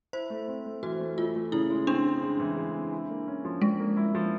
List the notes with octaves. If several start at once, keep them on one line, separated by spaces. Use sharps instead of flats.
E4 C5
A3
C4
A3
E3 F#4
A3
A3 F4
A3
C#3 E4
G#3
C4 D4
G#3
G#3
E3
G#3
C4
E4
A#3
C#4
F3
F3 G#3
A#3
E4
F3